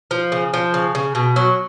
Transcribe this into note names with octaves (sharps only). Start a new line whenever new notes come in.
F3
C#3
F3
C#3
C#3
B2
F#3